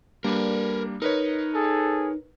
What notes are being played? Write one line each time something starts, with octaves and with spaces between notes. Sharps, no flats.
G3 A#3 D4 A#4 B4
D#4 A#4 B4 C#5
G#4 A4